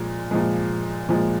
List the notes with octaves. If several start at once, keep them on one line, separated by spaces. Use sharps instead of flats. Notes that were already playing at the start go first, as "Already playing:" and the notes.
Already playing: A#2 F3 G#3
A#2 F3 G#3
A#2 F3 G#3